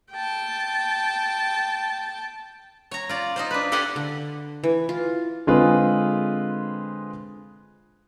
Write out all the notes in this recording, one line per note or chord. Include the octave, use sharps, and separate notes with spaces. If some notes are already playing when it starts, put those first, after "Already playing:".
G5 A5
C#5 A#5
F4 D5
D#4 F4 C5
D4 B4
G4 A4 C5 F5 F#5 G#5
D3
E3
F4
D3 G#3 C4 F4 G#4 B4